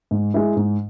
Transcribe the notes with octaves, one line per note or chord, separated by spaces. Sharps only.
G#2
G#3 E4
G#2